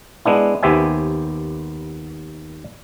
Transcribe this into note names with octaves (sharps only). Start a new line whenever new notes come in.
G#3 B3 D4 E4
D#2 B3 G4 C5 E5 G#5